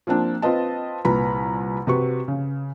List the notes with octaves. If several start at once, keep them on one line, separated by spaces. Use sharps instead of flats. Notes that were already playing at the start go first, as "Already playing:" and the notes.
F3 A#3 C4 D4
C4 F4 B4 D#5 A5
C2 A#2 B4 A#5 B5
C3 F#4 B4 C#6
C#3